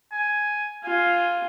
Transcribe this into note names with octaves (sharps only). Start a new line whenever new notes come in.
G#5
F4 G#5